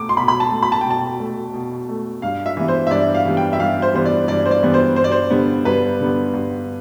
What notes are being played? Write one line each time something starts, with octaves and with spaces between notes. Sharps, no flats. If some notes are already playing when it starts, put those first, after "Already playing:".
Already playing: B2 A3 D6
C6
B2 B5
B5
A5
A3
B5
A5
G5
B2 A5
A3
B2
A3
G2 F5
E5
E3 G3 B3
C5
E5
G2 D5
F5
E3 G3 B3
G5
E5
G2 F5
C5
E3 G3 B3 C5
D5
G2 D5
C5
D5
E3 G3 B3
C5
G2 C5
D5
C5
D3 G3 B3
G2 B4
D3 G3 B3
G2